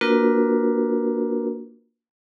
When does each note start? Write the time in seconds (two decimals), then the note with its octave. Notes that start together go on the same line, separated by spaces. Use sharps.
0.01 A#3 D4 F4 F#4 A#4 B4